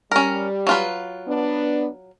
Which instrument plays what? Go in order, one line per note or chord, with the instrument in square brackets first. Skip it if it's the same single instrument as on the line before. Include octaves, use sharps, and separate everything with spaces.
[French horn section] G3 [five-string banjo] C#4 A#4
[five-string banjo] F#3 F4 B4
[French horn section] B3 D4